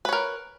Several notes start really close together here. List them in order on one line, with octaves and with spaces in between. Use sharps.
B4 C#5 A#4